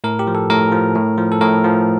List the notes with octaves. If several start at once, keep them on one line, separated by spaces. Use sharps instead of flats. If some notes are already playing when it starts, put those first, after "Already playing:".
A2 A#4
G4
F3
A4
A2 A#4
F3
A2
F3
A4
A2 A#4
F3